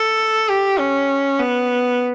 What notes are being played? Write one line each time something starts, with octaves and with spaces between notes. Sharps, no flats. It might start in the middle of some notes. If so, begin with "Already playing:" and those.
Already playing: A4
G4
C#4
B3